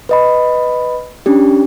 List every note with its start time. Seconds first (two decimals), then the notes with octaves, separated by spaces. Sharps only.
0.09 B4 D#5 B5
1.26 C#4 D4 G4